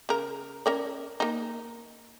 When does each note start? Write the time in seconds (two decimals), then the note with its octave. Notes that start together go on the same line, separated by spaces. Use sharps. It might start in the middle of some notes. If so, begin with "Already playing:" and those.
0.09 C#3 A#4
0.66 C#4 A#4 D5
1.20 A#3 D#4